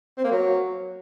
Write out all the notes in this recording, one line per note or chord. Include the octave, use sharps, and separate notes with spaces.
C4
A#3
F#3